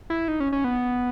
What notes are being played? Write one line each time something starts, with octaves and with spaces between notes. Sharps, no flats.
E4
D#4
C#4
C#4
B3